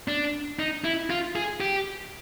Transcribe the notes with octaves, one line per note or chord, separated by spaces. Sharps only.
D4
D#4
E4
F4
G#4
G4